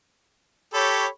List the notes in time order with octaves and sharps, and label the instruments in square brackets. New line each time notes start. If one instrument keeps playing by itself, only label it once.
[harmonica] G4 A4 [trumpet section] C#5 B5